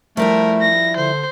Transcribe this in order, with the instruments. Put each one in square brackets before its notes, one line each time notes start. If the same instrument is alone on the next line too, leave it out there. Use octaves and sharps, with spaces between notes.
[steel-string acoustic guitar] F3 G3 E4 [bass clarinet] A3 [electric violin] A#4
[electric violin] A#6
[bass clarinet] D3 [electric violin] C5